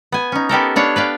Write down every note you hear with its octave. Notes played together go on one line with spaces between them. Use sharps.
B3 G#5
C#4 D#4
B3 G4 A4 A#4
B3 D4 C#5 F5
B4 D5 F5 G5